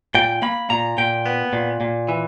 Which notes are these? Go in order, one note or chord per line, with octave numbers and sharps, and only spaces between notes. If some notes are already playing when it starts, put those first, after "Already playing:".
A#2 G5
A#3 B5
A#2 A#5
A#2 G5
B3
A#2
A#2
E3